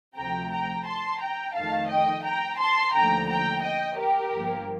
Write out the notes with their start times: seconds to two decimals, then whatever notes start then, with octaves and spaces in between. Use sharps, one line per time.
0.16 D2 C3 F3 A3 G5 A#5
0.51 G5 A#5
0.86 A5 C6
1.21 G5 A#5
1.55 F2 D#3 A3 F5 A5
1.89 D#5 G5
2.24 G5 A#5
2.58 A5 C6
2.93 D#2 D3 F3 A3 G5 A#5
3.29 G5 A#5
3.62 D#5 G5
3.98 G4 A#4
4.32 G1 G2 F3 A#3